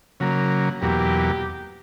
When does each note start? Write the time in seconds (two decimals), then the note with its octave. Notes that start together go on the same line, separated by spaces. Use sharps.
0.20 C#3 F#3 A#3
0.82 E2 B2 F#3 A#3 G4